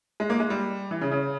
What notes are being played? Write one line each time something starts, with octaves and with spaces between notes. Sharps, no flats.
G#3
A#3
G#3
G3
E3
C#3
C#3